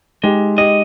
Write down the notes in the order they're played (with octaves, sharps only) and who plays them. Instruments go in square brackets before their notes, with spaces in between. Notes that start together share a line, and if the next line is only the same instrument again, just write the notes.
[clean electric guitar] G#3 [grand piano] D#4 G4
[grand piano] D#4 G4 [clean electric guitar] D#5